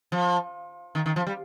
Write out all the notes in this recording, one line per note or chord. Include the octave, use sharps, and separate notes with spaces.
F3
D#3
D#3
F3
G3